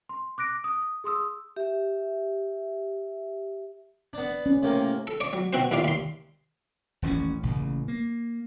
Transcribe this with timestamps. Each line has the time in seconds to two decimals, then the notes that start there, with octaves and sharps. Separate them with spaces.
0.09 C6
0.38 D6 F#6 A#6 D7
0.64 D#6
1.04 G#4 C6 D#6 E6
1.56 G4 E5
4.13 B3 D4
4.46 C#4
4.63 A2 C3 A#3
5.07 A4
5.20 C#5 D5
5.33 F#3
5.53 B2 C4 F#4 C5
5.71 D#2 A#2 F4 D5 F5
5.84 D#2 C6
7.02 D#1 A1 C4 C#4
7.43 A1 A#2 C#3
7.88 A#3